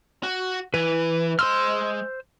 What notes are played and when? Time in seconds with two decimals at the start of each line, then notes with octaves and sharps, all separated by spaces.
0.23 F#4
0.74 E3 B4
1.39 G#3 C5 C6 E6 F6